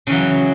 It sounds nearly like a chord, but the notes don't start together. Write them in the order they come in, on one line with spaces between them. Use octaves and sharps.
C#3 E3 F#3